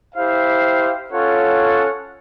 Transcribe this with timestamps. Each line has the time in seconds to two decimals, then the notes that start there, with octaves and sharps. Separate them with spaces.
0.15 E4 G4 C5 F5
1.11 C#4 F4 A4 C#5 F#5